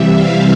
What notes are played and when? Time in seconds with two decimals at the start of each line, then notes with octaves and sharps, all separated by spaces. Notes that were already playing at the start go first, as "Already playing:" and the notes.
Already playing: C3 E3 G3 E5
0.11 F5